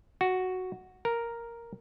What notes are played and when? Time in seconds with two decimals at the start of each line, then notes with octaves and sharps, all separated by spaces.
0.21 F#4
1.05 A#4